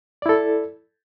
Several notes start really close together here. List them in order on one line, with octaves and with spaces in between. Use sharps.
D5 E4 A4